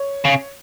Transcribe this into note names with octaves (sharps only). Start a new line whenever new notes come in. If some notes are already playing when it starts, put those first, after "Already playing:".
Already playing: C#5
C#3